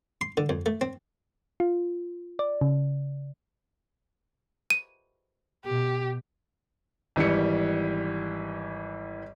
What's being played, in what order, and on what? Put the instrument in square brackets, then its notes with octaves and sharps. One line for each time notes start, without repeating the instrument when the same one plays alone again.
[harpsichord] C6
D3
F2
A3
C4
[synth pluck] F4
D5
C#3
[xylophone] D#7
[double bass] B2 [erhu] G4
[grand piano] G#1 E3 G3 C#7